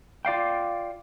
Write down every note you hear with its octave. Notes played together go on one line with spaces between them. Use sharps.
F4 D5 F5 G5